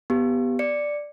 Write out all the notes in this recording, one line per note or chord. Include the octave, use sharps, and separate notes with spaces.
B3 G4
D5 C#7